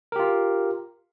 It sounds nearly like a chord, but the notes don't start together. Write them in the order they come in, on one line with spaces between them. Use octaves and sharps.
A#4 G4 F4